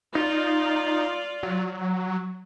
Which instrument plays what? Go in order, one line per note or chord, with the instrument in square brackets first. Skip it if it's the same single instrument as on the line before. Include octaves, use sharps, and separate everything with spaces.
[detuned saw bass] D#4 [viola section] F4 D5
[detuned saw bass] F#3